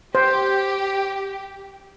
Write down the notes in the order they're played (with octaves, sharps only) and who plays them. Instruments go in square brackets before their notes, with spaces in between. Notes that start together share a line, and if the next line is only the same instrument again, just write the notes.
[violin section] G4 [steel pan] C5